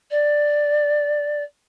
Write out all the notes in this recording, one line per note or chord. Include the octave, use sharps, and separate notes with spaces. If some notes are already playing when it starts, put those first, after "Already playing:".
D5